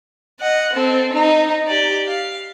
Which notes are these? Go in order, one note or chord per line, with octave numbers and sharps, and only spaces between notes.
D#5 F#5
C4 A4
D#4
G4 D5
F5